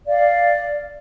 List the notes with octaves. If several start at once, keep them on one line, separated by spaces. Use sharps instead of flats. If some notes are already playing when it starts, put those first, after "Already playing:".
D5 F5